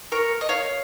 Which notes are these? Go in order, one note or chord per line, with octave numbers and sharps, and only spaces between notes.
A#4 C#5
D#5
C#5 F5